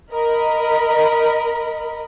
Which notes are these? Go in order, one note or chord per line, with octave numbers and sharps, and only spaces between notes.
A#4 D#5 B5